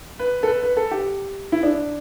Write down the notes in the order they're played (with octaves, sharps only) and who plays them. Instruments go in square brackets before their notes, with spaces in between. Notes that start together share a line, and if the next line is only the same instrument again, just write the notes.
[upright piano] B4
A4
B4
B4
A4
G4
E4
D4